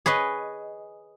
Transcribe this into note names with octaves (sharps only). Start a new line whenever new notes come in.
G#4 B4 C#5 D#5